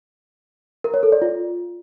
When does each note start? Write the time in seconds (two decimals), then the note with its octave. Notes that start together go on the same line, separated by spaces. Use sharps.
0.84 A#4
0.94 C#5
1.03 A4
1.12 D5
1.22 F4